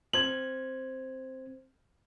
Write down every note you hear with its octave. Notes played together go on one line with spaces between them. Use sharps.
C4 C5 G#6 F#7